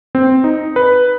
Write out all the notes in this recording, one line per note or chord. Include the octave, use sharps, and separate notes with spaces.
C4
D#4
B4